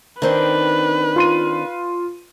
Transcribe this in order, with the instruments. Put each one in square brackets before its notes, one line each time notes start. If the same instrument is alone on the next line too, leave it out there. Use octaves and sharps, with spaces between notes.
[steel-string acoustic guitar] D#3 C4 D4 [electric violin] B4
[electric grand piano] F4 C6 D#7